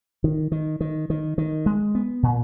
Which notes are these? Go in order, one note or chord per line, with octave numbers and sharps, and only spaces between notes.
D#3
D#3
D#3
D#3
D#3
G#3
B3
A#2